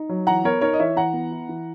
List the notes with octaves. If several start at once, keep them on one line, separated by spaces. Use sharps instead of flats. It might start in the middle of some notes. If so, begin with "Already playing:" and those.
Already playing: D#4
F#3
E3 F#5 A#5
B3 A#4 C#5
D#4 A#4 C#5
D#5
E3 C#5 E5
E3 F#5 A#5
B3
E4
E3